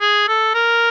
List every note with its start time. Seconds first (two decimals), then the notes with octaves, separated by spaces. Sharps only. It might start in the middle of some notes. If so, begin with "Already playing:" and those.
0.01 G#4
0.28 A4
0.55 A#4